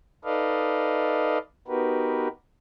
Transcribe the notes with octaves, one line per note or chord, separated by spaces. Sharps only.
D#4 A4 B4 D5 D#5 F5
B3 D#4 F#4 G4 A#4 B4